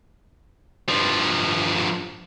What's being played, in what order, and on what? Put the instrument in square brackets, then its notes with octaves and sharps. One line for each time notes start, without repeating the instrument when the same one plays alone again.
[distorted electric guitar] G2 F3